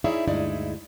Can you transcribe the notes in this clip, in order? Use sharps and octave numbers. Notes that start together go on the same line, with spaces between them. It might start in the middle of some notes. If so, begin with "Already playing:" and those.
D#4 E4 G#4 C#5 D5 E5
D2 G2 G#3 D#4 E4 D5